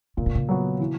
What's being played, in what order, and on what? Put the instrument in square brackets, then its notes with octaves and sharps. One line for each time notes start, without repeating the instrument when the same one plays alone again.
[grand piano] A#2 [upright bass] C#3
[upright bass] B2
C#3
[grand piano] F#3 B3 F#4
E3